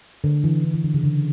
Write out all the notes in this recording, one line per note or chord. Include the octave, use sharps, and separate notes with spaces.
D3
E3
D3
E3
D3
C#3
D3